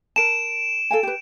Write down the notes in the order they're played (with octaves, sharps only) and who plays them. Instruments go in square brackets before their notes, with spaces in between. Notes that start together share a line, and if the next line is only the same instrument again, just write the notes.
[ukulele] A#4 A5 [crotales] D7 E7
[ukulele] A4 F5 G#5
G4 B4